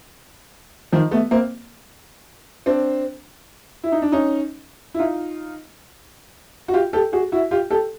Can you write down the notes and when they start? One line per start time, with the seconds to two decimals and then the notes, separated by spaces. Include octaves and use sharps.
0.92 D#3 F3
1.11 A3 B3
1.31 A#3 C4
2.66 C4 D4
3.84 E4
3.92 D#4
4.02 D4
4.12 C#4 D#4
4.94 E4
4.99 D#4 F4
6.68 F#4
6.73 F4 G4
6.93 G4 A4
7.13 F#4 G#4
7.32 E4 F#4
7.51 F4 G4
7.70 G4 A4